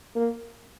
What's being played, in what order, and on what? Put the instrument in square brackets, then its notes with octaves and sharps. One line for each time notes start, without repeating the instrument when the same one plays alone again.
[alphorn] A#3